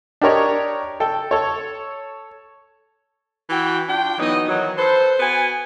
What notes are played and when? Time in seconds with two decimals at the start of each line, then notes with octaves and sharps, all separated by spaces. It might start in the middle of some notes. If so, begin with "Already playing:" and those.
0.21 D4 G4 A#4 C#5 D#5
1.00 A4 G5
1.31 A4 C#5
3.50 E3 F#4 G5
3.89 D4 F4 G5
4.18 E3 F#3 B3 D#4 D#5
4.47 D#3 E3 F#3
4.77 A4 B4 C5
5.20 B3 F#4 G#5